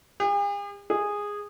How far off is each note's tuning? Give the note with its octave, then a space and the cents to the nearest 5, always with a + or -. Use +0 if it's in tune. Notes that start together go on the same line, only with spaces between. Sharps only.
G#4 -45
G#4 -10